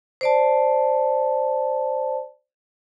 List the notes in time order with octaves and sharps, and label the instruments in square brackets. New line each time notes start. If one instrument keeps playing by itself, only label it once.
[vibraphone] C5 D5 A5